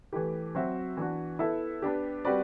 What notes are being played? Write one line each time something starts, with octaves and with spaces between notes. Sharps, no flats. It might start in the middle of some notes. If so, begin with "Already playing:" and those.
E3 A3 E4 G4
F#3 C4 F#4 C5 E5
E3 B3 D4 F#4
B3 E4 A4 E5
B3 D4 G4
G3 C4 F#4 B4 D5